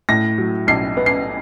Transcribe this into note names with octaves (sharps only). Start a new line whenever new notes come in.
A2 A#6
F#3
B1 C7
B3
C7